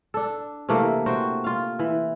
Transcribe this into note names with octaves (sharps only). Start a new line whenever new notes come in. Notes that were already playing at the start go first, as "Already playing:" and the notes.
D4 A4
C3 E3 A3 A#3
F#4 C5 G5
F4 F5
E3